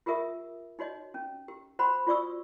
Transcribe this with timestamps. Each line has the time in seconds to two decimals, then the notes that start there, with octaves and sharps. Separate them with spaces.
0.06 F4 G4 G#4 A#4 E5 D#6
0.79 D#4 F#4 C#5 D#5
1.14 C#4
1.48 G4
1.79 F#4 C5 F#5 B5 C6
2.07 F4 F#4 D5 C#6 D#6 E6